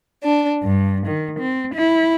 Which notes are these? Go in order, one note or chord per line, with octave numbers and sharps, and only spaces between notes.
D4
G2
D#3
C4
E4